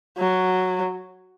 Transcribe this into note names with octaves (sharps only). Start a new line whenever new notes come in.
F#3